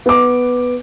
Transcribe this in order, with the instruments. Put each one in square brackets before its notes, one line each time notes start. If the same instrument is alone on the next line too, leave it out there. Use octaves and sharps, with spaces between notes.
[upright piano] B3 D6